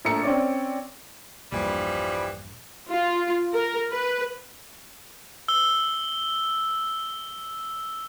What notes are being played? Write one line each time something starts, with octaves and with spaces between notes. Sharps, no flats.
A#1 A3 A#5 E6 C#7
C4 C#4 D5
A#1 E2 G2 E3 F3 G3
F4
A#4
B4
E6 G7